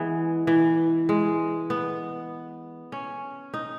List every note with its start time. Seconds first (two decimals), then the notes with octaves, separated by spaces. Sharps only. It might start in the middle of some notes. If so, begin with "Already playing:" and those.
Already playing: E3 G#3 B3
0.47 E3
1.09 G#3
1.70 B3
2.92 C#4
3.54 D#4